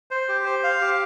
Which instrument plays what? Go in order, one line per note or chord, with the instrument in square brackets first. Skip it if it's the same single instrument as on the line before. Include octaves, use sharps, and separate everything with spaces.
[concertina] C5
G4
C5
F5
G4